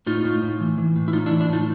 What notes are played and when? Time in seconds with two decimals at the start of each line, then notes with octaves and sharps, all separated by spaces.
0.06 A2 D#4 F4
0.24 A2
0.43 A2
0.60 E3
0.78 E3
0.96 A2
1.08 E4
1.13 A2 D#4 F4
1.26 D4 E4
1.31 E3
1.40 D4 E4
1.49 A2 D#4 F4